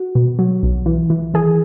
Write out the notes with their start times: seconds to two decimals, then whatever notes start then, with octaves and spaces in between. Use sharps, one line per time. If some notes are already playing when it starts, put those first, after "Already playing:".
Already playing: F#4
0.15 B2
0.39 F#3
0.63 B1
0.86 E3
1.10 E3
1.34 E3 G#4